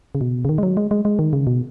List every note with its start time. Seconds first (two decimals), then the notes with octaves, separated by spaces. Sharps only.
0.15 C#3
0.21 B2
0.45 C#3
0.49 D#3
0.58 G#3
0.63 F#3
0.77 G#3
0.91 G#3
1.05 G#3
1.19 D#3
1.33 C#3
1.47 B2